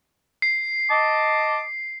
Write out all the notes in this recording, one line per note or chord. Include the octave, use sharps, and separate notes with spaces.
C7
D#5 A5 D6